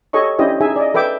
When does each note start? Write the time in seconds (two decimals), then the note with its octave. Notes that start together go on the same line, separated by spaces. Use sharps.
0.13 G4 A4 C#5 D#5 C#6
0.39 C#4 D4 E4 G4 C5 D#5
0.60 D#4 G#4 E5 G#5
0.76 D5 D#5
0.94 A4 B4 E5 G5 D6